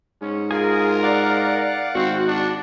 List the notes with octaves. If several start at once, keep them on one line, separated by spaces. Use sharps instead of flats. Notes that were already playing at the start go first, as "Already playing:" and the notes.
G#2 C#4
F4 G#4 A#4
D5 F5 F#5
G#1 C4 F#4
D4